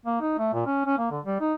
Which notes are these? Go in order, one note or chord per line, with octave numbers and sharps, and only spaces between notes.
A#3
D#4
A3
A#2
C#4
C#4
A#3
D3
G3
D#4